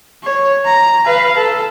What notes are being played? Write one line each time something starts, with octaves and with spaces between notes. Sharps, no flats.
C#5
A#5
B4 F5
A4